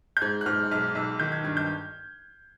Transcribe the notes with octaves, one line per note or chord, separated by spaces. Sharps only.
G6
G#2 G#6
F#6
G#2 F6
B1 F6
B1 E6
D#3 G6
G#6
G2 G#6
G6